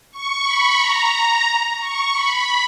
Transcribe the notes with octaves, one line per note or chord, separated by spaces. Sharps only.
C#6
B5
A#5
C#6
B5